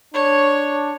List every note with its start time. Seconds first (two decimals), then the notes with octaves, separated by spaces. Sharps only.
0.14 D4 C#5